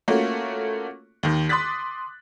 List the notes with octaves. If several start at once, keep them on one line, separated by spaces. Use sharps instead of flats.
A3 A#3 C#4 F4 F#4
D#2 D#3
C6 D6 D#6 F#6 A6 B6